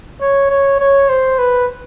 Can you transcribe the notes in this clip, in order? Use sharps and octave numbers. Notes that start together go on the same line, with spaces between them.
C#5
C#5
C#5
C5
B4